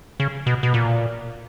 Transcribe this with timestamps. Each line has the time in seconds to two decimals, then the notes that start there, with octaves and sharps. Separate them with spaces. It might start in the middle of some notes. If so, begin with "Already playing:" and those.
0.20 C#3
0.46 B2
0.63 B2
0.74 A#2